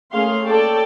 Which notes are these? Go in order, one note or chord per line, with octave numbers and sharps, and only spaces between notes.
A3 A#3 C#4 G#4 F5 C6
A4 C#5 D5 G5 A5